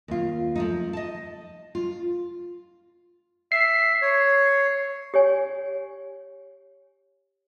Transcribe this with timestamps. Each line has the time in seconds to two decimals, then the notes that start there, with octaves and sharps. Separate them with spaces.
0.08 D#2 F4
0.56 F3 A3 D#4
0.93 D#5 A5
1.75 F4
3.52 E5 C7
4.02 C#5
5.14 G4 C#5 G#5